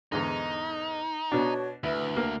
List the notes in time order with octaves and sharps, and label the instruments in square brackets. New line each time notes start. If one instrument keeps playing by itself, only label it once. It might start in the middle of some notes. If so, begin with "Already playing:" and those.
[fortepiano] E2 G#2 D3 [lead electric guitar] D#4
[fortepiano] B2 D4 [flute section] F#4 C#5 A5
[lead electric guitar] D2 [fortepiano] E4 [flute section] B4
[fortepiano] A#3